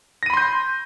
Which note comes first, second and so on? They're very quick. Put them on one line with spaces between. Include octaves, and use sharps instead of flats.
A#6 D#7 B5 C6 G6